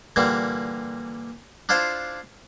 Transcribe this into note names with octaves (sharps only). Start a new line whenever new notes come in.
A#2 D3 E3 G3 A#3
D4 E4 F4 C5